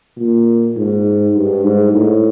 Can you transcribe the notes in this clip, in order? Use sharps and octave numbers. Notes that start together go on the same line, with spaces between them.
A#2
G#2
G2
G#2
A2